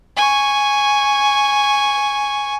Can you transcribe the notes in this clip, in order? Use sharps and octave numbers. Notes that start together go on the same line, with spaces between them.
G#5 C#6